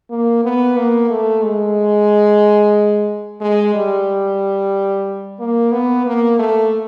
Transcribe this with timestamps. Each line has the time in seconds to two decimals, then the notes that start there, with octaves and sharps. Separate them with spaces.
0.11 A#3
0.44 B3
0.77 A#3
1.10 A3
1.43 G#3
3.41 G#3
3.74 G3
5.40 A#3
5.72 B3
6.06 A#3
6.39 A3